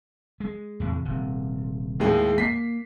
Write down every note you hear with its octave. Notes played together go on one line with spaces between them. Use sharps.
G#3
E2 A2 C3
D#1 C3
D#2 A2 G#3
A#3 B6 C7